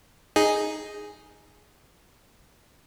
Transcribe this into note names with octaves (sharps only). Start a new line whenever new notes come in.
D#4 G#4